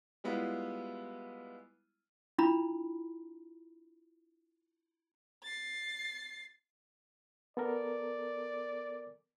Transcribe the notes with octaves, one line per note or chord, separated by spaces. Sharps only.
G3 G#3 B3 E4 F4
D4 E4 F4 A#5 B5
A6 C7
B3 A4 A#4 D5